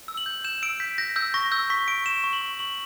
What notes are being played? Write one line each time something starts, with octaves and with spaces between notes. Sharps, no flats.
E6
F#7
G6
G6 E7
E6 D7
G6 B6
G6 A#6
E6 G6
C#6 A#6
E6 G6
C#6 B6
C#6 D7
C#6 E7
C#6
F#7
C#6
C#6 F#7